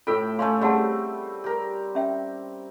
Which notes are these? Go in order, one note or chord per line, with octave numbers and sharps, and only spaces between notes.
A2 F4 A4 B4 E5 G5
A3 C#4 C#5 F5 C6
G3 C4 G#4 F#5 A5
G4 A#4
C#4 E5 G5